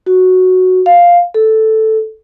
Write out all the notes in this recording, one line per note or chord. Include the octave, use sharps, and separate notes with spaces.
F#4
F5
A4